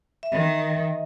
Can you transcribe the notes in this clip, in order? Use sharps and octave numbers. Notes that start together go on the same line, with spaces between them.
E5
D#3 D#5